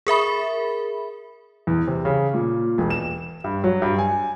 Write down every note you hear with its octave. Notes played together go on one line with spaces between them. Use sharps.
G#4 A#4 E5 B5
E2
C3
C#3
A#2
E1
E7
G2
F#3
G2
G#5